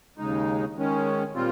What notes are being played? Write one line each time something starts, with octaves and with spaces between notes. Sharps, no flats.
D#2 C#3 G#3 D#4
D#3 G#3 C#4
A#2 G3 C4 F4